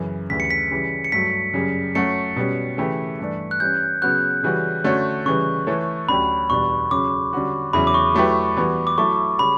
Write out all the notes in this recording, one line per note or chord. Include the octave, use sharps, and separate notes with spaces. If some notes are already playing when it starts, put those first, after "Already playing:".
Already playing: F#2 C#3 E3
D2 C#3 E3 G3 B6
C#7
B6
C#3 E3 G3
C#7
G2 F#3 A3 B6
F#2 C#3 G3
F#3 A3 C#4 F#4 C#7
B2 G3 C#4
C#3 E3 A3 E4 G4
G2 E3 A3 D4
F#6
E3 G3 C#4 G6
C#3 F#3 B3 F#4 F#6
C#3 E3 G3 C#4 F#4
D3 A3 C#4 F#4 C#5
C#3 E3 G3 C#6
E3 A3 E4 A4 C#5
D2 D3 F#3 C#4 G4 B5
E2 B2 G3 D4 C#6
C#3 F#3 C#4 D6
D3 G3 C#4 F#4
E2 C#3 F#3 C#4 E4 B5
D6
C#6
F#3 A3 E4 G4 B4
E3 G3 B3 F#4
D6
F#3 A3 E4 A4 E5 C#6
C#3 G3 C#4 B5